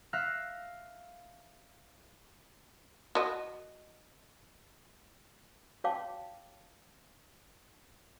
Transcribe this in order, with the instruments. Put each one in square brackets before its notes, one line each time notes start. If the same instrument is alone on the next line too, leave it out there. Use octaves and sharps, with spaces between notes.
[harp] E5 F5 F#6 A#6
[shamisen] F#4 D#5
[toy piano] F#4 C#5 F5 G5 A5 D6